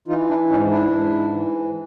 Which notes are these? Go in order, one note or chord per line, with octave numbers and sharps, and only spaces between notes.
E3 D#4 F4
D4 E4
G#2 C#4 D#4
D4 E4
G#2
E3